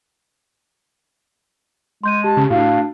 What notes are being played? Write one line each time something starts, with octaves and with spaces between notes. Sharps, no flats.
G#3 C6 G6 D#7
G4 A5
C#3
A2 D4 F#4 F5